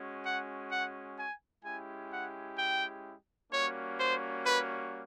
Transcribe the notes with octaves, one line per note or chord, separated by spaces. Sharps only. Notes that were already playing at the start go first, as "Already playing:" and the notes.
Already playing: G#3 C#4 F#4
F#5
F#5
G#5
G#3 C#4 E4 G4 G#5
F#5
G5
G3 A#3 C#4 F#4 C#5
C5
B4